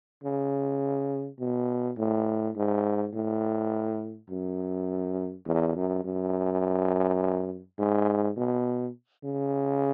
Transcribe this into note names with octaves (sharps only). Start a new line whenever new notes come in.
C#3
B2
A2
G#2
A2
F#2
E2
F#2
F#2
G#2
B2
C#3